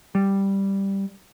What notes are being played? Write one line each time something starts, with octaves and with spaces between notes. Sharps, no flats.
G3